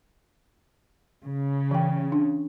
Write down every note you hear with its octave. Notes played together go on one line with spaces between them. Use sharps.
C#3
E3 G5
D4